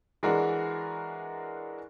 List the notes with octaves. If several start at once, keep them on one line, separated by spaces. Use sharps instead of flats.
E3 G#3 D4 F#4 A#4